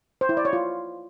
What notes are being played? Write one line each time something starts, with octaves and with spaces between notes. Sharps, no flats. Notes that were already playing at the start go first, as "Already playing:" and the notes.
C5
E4
D5
C#5
F4